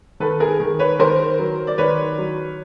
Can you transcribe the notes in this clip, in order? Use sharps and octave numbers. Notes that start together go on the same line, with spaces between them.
D#3 A4 B4
G#4 A#4
D#3
B4 C#5
D#3 A#4 C5
F#3
D5
D#3 B4 C#5
F#3